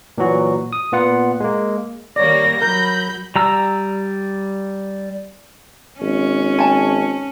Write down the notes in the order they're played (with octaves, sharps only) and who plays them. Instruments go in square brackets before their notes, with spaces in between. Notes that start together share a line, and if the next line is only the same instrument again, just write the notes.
[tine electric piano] A#2 E3 F#3 F#4
D#6
A#2 B3 F4 F#5
G#3 A#3
[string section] D#3 G3 A#3 [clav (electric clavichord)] C#5 D5 [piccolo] A#6
[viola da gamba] F#3 [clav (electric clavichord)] A#4 [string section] B5 G6
[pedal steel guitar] G3 A#5 E6
[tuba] G#1 [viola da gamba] C#4
[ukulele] G#5 A5